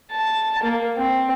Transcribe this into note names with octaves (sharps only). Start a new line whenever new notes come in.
A5
A#3
C4